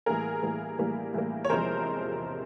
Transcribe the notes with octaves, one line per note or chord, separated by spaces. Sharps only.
A2 E3 G3 A#3 G#4 A#4
A2 E3 G3 A#3
A2 E3 G3 A#3
A2 E3 G3 A#3
C#5
E2 C3 F3 G#3 A#4 C5